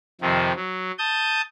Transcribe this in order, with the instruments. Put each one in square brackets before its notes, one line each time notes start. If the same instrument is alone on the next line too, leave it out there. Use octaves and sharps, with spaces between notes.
[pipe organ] F2 C3 D#3 F3
F#3
A5 D#6 G6